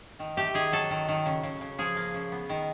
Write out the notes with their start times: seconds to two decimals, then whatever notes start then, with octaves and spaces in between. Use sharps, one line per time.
0.19 D#3
0.37 A3 G4
0.54 D#3 G#4
0.72 F#3 A4
0.90 D#3
1.08 D#3
1.26 C#3
1.43 C#3
1.61 C#3
1.78 F3 G#4
1.97 A#3
2.14 C#3
2.32 B3
2.49 D#3